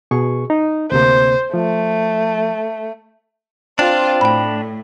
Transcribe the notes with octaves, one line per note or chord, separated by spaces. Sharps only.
B2 G#4 C#6
D#4
D2 C3 A#3 C5
F3 A3
C4 D4 F4
A2 G5 B5